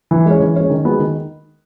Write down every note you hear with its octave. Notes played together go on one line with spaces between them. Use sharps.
E3
G#3 C#4
E3
G#3 C#4
D#3
G#3 B3 F#4
D#3